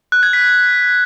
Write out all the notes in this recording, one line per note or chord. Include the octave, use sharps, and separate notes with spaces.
F#6
G#6
B6